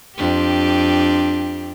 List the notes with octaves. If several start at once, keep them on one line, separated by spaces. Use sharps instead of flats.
F2 D4 G4